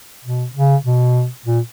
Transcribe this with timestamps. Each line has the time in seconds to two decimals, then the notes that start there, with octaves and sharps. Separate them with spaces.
0.24 B2
0.55 C#3
0.85 B2
1.46 A#2